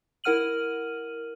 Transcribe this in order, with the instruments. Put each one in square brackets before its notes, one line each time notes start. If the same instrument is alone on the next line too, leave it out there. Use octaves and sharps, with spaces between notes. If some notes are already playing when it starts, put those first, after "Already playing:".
[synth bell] E4 A#4 F#5 F6 D#7 F#7